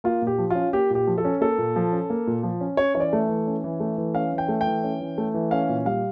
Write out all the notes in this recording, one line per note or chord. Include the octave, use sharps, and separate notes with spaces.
A#3 F4
A#2
G4
F3
C#4 F4
A#3 G4
A#2 G4
F3
A4
C#4
A#3 A4
A#2
F3
C#4
A#3
A#2
F3
C#4
C#4 C#5
E3 C#5
D5
A3
E3
C#4
E3
A3
E3
C#4 F5
E3
G5
A3
G5
E3
C#4
E3
A3
E3
C#4 F5
A#2
G3 F5